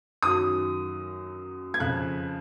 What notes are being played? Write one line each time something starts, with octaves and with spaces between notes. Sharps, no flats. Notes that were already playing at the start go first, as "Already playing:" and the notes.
F#2 D#3 F#3 D#6
G#6
F2 C#3 F3 F#6